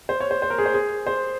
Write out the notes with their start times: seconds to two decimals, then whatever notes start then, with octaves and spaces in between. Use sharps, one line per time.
0.09 C5
0.20 C#5
0.31 C5
0.42 C5
0.50 A#4
0.58 G#4
0.66 C5
0.74 G#4
1.07 C5